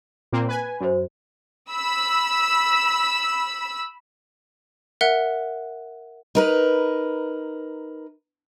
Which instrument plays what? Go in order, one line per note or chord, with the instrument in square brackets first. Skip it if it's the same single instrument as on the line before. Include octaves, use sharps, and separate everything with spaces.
[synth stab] A#2 A#3 C4
B4 G#5
[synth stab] F#2 [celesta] F#4 C5
[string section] B5 E6
[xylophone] A#4 E5 F#5 F#6
[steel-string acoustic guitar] D#4 A#4 B4